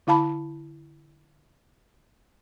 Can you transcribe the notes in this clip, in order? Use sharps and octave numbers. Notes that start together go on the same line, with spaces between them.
D3 E4 F5 A5 B5